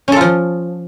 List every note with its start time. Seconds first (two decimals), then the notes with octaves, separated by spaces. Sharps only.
0.08 C#4
0.12 A4
0.16 F4
0.21 F3